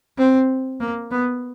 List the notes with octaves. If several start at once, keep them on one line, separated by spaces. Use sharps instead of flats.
C4
A#3
B3